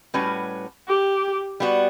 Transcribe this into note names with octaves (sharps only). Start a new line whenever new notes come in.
A2 G3 C#4 F#4 B4
G4
G3 B3 F#4